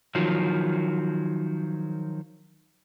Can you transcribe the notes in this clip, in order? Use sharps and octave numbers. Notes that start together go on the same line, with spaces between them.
D#3 F3 F#3